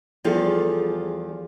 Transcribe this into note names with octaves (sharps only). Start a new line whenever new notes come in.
E2 F3 G3 F4 G#4 A4